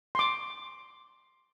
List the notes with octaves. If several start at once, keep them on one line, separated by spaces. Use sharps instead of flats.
C6 D6